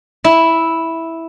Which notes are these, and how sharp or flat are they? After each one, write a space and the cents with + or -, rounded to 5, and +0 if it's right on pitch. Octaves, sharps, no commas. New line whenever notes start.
E4 -5